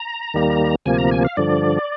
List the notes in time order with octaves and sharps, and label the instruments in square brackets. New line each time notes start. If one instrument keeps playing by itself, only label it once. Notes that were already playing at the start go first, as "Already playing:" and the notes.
Already playing: [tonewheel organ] A#5
D#2 D#3 G3 A#3
D2 C3 F3 A#3 G#5
A#5
G#5
F5
G2 D3 F3 D5